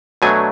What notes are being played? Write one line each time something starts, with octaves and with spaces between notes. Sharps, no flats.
B2 F#3 A3 D4 G#5